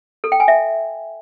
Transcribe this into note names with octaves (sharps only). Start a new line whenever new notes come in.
A4
G5
G#5
E5